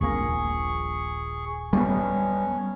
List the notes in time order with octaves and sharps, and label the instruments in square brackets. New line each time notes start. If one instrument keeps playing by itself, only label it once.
[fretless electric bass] D#1 A#1 A#3 [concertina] G#4 C#6
[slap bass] G3 A3 B3 [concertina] C#4